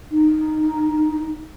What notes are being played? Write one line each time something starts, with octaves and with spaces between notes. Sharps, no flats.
D#4